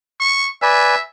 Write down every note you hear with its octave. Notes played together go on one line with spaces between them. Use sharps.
C#6
B4 D5 E5 G#5